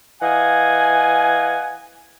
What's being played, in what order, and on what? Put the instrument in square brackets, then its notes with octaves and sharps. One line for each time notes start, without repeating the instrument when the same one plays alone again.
[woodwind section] E3 D#5 F5 F#5 G#5